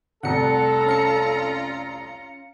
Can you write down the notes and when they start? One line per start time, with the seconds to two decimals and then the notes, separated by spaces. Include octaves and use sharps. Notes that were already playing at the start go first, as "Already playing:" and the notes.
0.23 F1 C2 F4 A4 F#5 A#5 C#7
0.86 C#4 F5 C#7